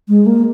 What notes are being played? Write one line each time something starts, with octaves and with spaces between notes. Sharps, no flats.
G#3
A#3